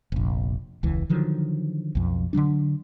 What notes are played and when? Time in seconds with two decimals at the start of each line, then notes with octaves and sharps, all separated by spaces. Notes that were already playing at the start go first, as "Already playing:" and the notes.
0.12 F1 A#1
0.83 E1 C#2 E3
1.10 D3 D#3 F3 F#3
1.95 B1 F2
2.33 D3 D#3 F#3 D4